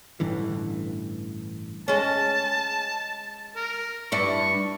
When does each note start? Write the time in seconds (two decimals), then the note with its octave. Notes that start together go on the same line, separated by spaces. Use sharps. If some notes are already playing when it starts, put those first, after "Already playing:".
0.20 A1 G2 D3 E3
1.88 G#3 C#4 A5
3.56 A#4
4.12 G2 D4 E4 C#6